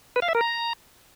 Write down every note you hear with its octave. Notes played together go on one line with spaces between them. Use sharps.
B4
F5
E5
A#4
A#5